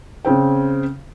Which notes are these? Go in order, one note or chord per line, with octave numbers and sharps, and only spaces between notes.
C#3 C4 G5